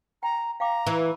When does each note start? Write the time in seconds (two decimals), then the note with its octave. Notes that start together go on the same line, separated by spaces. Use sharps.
0.23 G5 A#5
0.60 F5 G5 A#5 D6
0.87 E3